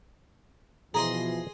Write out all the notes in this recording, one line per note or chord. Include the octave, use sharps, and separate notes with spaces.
B2 E3 F3 G#4 D#5 A#5 C6